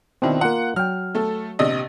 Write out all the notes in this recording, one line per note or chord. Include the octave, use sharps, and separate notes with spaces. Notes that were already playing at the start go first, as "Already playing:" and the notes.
B2 D#3 C4 D4 E4
A#3 F4 F#5
F#3 G5 F6
A3 A4
A#1 C3 D#5